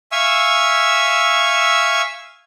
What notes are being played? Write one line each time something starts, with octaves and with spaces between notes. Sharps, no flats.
E5 F5 G#5 C#6 E6